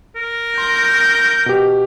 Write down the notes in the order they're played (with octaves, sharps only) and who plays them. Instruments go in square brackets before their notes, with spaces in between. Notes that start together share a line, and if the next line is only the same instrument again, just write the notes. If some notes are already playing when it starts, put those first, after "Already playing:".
[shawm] A#4
[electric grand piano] C6 [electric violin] G6
[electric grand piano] B2 G4